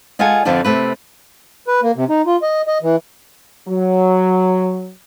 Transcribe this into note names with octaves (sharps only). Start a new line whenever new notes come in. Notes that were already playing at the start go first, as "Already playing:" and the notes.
G#3 F4 A4 F#5 G#5
F2 D3 F3 B3 D4
C3 A3 B4
B4
A#3
C3
D#4
F4
D#5
D#5
E3
F#3